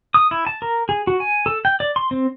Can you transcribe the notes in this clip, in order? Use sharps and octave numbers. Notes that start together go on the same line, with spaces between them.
D#6
E4
A5
A#4
G#4
F#4
G#5
A4
G5
D5
C6
C4